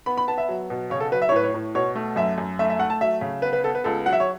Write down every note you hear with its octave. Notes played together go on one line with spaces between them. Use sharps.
B3 B5
B5
B3 A5
E5
F#3
B2
C#3 C#5
A4
F#3 B4
E5
C#5
A2 B4
C#5
A2
B2 C#5
A3
F#2 E5
F#2
A3 E5
E5
A3 F#5
A5
F#3 E5
C#3
B3 B4
B4
B3 A4
B4
C#2 A4
F#3 F#5
E5
C#5